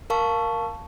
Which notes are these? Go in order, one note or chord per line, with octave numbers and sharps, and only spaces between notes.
A#4 F5 A5 C#6